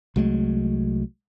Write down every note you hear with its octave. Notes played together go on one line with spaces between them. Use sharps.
C2 F#3 G#3 A3